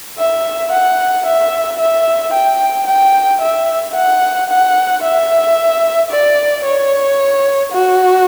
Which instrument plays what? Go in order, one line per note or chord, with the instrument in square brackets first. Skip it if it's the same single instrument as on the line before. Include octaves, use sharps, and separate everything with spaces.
[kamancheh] E5
F#5
E5
E5
G5
G5
E5
F#5
F#5
E5
D5
C#5
F#4